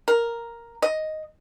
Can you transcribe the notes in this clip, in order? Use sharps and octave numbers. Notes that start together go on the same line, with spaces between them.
A#4
D#5